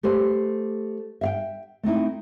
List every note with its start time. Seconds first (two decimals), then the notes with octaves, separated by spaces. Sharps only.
0.03 A3 G4 B4 C5
1.21 E5 F5 G5
1.83 A3 C4 D#4 E4